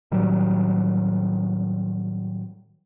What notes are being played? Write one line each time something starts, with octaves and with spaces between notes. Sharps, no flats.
A2 D#3 F#3 G3